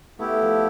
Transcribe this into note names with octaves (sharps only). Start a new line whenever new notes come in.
A3 B3 E4 G4
F3